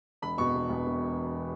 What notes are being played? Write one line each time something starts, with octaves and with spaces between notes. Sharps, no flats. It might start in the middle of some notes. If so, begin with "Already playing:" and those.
E1 B5
E2 B2 C#6
E1
E2 B2
E1